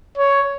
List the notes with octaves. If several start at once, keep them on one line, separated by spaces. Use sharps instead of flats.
C#5